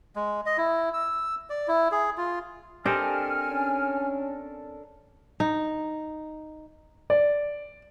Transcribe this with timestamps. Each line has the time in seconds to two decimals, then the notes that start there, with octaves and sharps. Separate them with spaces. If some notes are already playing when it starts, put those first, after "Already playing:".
0.16 G#3
0.46 D#5
0.57 E4
0.93 E6
1.50 D5
1.68 E4
1.92 G#4
2.17 F4
2.86 C4 D4 G4 A4 A#4 D#5 G#5 F6
3.50 C#4
5.40 D#4
7.10 D5